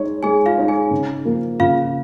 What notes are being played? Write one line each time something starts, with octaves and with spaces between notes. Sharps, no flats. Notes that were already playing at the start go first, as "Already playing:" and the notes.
Already playing: G#3 D#4 C#5
G#3 G#4 G#5
F4 F5
D#4 C#5
G#4 G#5
C#3
F3 A#3
C#3 F4 F5